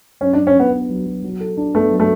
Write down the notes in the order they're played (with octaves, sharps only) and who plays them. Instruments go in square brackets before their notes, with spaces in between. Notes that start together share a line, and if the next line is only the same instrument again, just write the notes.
[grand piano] F#3 [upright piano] C#4
[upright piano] D4
[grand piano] F#3
[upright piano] C#4
[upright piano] B3 [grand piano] D4
[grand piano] B3
F#3
F#3
F#3
A4
D4
[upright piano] A3 [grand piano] B3
[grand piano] F#3
[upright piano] A3